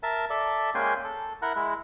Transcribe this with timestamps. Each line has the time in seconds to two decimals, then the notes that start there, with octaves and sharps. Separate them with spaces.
0.03 A#4 E5 A5
0.30 A4 D5 E5
0.75 G#3 A#3 C#4 G5 G#5 C6
1.04 A4
1.42 E4 A#4 F#5
1.56 G#3 E4